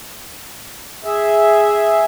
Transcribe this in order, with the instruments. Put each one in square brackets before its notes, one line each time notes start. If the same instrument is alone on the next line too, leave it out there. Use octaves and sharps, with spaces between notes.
[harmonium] G#4 E5